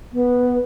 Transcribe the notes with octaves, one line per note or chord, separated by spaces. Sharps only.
B3